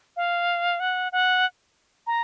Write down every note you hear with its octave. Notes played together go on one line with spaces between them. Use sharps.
F5
F#5
F#5
A#5